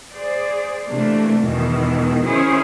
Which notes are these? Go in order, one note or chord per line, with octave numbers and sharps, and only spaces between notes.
G#4 C5 D5
C3 E3 A3 A#3 D4
E2 G#2 B2 D#3 E3
D#3 C#4 E4 G#4 C5